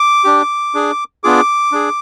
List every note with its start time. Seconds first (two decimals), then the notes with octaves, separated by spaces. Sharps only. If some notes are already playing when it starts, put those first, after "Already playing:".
Already playing: D6
0.24 D4 G4
0.75 D4 G#4
1.24 B3 D4 F4 G#4 D6
1.72 D4 G#4